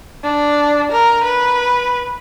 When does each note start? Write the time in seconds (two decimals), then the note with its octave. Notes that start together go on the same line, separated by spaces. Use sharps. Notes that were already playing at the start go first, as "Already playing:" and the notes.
0.24 D4
0.92 A#4
1.24 B4